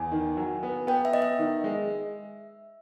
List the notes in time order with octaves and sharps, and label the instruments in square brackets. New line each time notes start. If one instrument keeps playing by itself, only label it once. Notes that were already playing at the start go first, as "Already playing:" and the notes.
Already playing: [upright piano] E2 [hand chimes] G#5
[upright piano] D#3
F#3
B3
[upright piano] B3 [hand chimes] G5
[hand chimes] E5
[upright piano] B3 [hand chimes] D#5
[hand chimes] E5
[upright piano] D#3
G#3